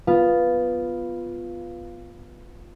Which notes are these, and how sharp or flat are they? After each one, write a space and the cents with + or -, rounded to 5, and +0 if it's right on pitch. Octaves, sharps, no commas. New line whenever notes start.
B3 +0 F4 +0